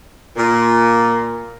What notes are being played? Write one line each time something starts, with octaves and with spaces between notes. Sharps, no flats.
A#2